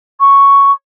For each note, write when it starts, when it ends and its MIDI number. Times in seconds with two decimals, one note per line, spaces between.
0.20 0.72 85